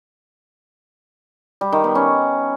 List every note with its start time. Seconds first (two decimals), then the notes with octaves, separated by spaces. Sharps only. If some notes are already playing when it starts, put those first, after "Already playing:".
1.61 G3
1.72 D#3
1.84 B3
1.95 C#4